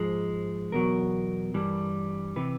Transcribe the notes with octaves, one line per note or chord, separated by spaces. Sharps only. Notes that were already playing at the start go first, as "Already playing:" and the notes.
Already playing: G#2 F3 G#3
E2 B2 F#3 A#4
G2 E3 G3
C3 E3 B4